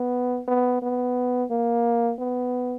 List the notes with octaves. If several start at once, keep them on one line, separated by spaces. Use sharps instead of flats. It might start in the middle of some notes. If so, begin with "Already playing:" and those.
Already playing: B3
B3
B3
A#3
B3